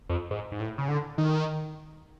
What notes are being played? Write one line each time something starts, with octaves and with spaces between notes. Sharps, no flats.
F2
G#2
G#2
A2
C#3
D3
D#3